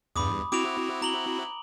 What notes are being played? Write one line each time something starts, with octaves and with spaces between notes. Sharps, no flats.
E2 G2 B5 D6 D#6
C4 E4 F#4 D6 D7 F7
A#5 F#7 G7